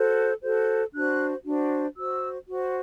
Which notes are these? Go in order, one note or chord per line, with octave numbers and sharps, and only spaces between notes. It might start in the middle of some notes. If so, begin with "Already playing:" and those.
Already playing: F#4 A4 C5
F#4 A4 C5
D4 F#4 C5 F#6
D4 F#4 C5
F#4 C5 E6
F#4 C5